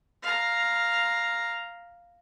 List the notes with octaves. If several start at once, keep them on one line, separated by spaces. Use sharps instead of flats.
F5 A#5